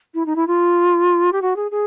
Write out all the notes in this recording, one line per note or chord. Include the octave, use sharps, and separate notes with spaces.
E4
D#4
E4
F4
G4
F#4
G#4
G#4